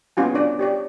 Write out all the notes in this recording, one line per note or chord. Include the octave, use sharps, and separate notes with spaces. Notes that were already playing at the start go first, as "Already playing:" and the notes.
B3 C#4 F4 F#4 G#5
D4 C#5 D5
G4 C#5 D5